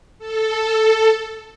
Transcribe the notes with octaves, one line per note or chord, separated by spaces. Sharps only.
A4